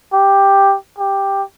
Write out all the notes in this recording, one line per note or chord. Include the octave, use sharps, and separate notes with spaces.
G4
G4